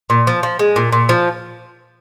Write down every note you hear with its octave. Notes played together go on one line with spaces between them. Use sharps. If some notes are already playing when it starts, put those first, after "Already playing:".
A#2
F3
F3
G#3
A#2
A#2
F3